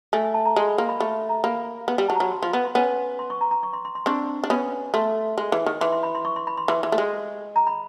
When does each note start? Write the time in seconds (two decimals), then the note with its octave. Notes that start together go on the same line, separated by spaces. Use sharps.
0.13 A3 G#5
0.24 G#5
0.34 A5
0.45 A#5
0.56 G#3 C6
0.68 B5
0.78 A#3 C6
0.89 B5
1.00 A3 B5
1.29 A#5
1.44 A#3 B5
1.88 B3
1.98 G3
2.08 F#3 A5
2.15 A#5
2.20 F#3 B5
2.32 C6
2.42 F3 C6
2.53 B3 B5
2.65 C6
2.75 B3 C#4
3.19 C6
3.30 C#6
3.41 A#5
3.51 A#5
3.63 C#6
3.73 C6
3.85 C6
3.95 C6
4.06 C4 D4 C#6
4.44 D4
4.50 B3 C#4
4.94 A3 C6
5.38 G#3
5.52 E3
5.66 D#3
5.81 E3 C6
5.92 C6
6.03 B5
6.15 C6
6.25 C#6
6.36 C6
6.47 B5
6.57 C6
6.68 E3 C6
6.83 E3
6.92 A3
6.98 G#3
7.56 A#5
7.67 B5